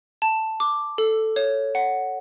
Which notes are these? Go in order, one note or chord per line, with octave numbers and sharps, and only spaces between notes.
A5
D6
A4
C#5
F#5